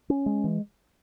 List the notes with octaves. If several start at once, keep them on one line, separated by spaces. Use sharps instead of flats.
C#4
G#3
E3